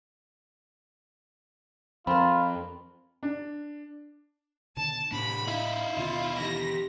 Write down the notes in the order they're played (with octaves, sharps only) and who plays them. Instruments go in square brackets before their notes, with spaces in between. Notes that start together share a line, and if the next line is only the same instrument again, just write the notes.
[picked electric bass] F2 [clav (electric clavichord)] C4 A#4 [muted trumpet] F4 [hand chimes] B5
[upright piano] D4
[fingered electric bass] B2 D3 D#3 [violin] A5
[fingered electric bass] A2 [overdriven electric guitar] C3 D4 [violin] B5
[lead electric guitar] D#4 E4 [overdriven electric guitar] F5
[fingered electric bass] D#2 B2 D3 [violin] F4
[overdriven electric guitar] E3 G4 [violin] A#6